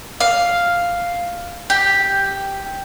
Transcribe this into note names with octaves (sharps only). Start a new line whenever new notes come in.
F5
G4